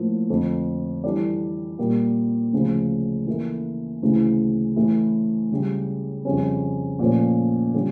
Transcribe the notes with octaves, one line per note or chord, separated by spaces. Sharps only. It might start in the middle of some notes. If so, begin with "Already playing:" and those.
Already playing: A2 F3 A#3
F2 D3 A3
E3 G3 D4 A4 D5
A#2 G3 A#3
D2 C#3 F3
E3 A#3 E4 A4
D2 C#3 E3
A2 E3 A3 E4
C#2 C#3 G3
F2 C#3 G3 C#4
A#2 F3 A3 C#4
D3 G3 C#4